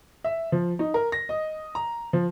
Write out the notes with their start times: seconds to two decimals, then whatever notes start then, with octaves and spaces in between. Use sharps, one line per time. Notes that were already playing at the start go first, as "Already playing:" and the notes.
0.24 E5
0.52 F3
0.79 D#4
0.94 A#4
1.12 A#6
1.29 D#5
1.75 A#5
2.13 F3